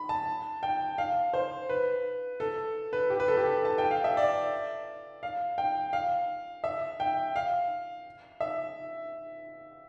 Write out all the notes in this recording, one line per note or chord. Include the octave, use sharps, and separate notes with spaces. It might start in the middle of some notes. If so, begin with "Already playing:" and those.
Already playing: B5
A5
G5
F5
C5
B4
A4
B4
G4
B4
A4
G4
A4
A5
G5
F5
E5
D5
F5
G5
F5
E5
G5
F5
E5